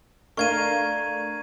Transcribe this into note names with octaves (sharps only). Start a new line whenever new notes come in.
A3 D4 A#4 F5 C#6 G#6 D#7